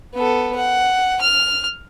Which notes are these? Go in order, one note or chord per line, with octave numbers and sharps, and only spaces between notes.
B3 A4
F#5
F6